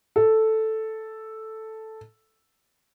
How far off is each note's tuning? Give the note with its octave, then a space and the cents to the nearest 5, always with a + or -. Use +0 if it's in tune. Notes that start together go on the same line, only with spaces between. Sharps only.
A4 +0